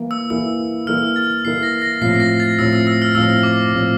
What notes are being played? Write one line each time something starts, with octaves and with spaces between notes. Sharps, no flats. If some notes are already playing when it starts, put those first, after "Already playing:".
Already playing: E3 A#3 E4 A#4
E6
E3 A#3 E4 A#4 E6
E3 A#3 E4 A#4 F6
A6
E3 A#3 E4 A#4 C7
A#6
A#6
A2 F3 C4 C7
A#6
A6
A2 F3 C4 E6
E6
E6
F6
A2 F3 C4 E6
D6
A2 F3 C4